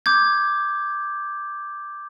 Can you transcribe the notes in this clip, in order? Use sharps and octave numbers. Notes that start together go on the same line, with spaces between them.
D6 G6 G#6